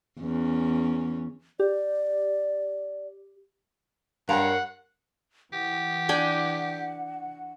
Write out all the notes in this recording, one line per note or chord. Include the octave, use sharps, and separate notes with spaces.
E2 C#4
G4 D5
G2 A#4 C#5 F5 F#5 A#5
E3 G4 F#5
D4 G5 G#5